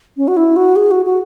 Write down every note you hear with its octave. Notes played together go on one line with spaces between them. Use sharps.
C#4
F#4
E4
F#4
G#4
F#4
F#4